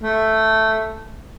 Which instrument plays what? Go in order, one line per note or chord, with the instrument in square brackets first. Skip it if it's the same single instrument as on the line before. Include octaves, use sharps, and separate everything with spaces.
[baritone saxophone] A3